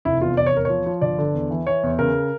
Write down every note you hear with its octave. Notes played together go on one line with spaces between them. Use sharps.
F1 E4
E2 F4
F1 D5
C#5
E2 A#4
F3 C#5
F3
G1 D5
D3
E2
E3
E3 C#5
E2
C#3 A#4